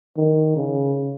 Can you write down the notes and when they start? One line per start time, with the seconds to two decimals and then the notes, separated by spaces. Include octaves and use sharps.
0.17 D#3
0.56 C#3